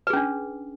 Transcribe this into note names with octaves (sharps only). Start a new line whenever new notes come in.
C#4 D4 G#4 B4